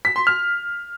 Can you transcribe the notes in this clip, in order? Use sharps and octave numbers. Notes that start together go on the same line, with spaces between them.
B6
C6
F6